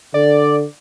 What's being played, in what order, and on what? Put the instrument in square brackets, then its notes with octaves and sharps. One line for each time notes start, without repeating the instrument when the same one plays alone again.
[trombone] D3 [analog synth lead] D5